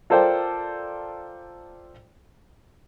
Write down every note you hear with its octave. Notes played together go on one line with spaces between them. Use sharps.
F4 A4 A#4 C5 D5 G5